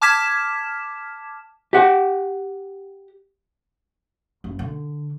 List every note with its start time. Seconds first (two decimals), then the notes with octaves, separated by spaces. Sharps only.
0.02 A5 D6 F6 G#6 B6 E7
1.73 G4 F#5
4.44 F#1
4.59 D3